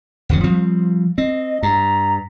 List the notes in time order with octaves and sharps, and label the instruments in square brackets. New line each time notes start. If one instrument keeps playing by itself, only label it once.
[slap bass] D1 F2 C#3
F3 G3 C4
[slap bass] C4 [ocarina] D#5
[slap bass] G2 [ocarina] A#5